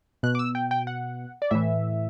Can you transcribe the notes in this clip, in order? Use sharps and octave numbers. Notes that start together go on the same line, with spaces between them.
B2 F#6
D6
E6
G5
G5
F#5
D5
A2 E3 E5